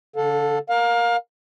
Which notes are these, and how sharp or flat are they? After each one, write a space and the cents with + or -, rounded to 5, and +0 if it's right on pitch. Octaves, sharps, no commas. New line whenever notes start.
D3 -45 A4 +0 F5 +40
A#4 +5 F5 +25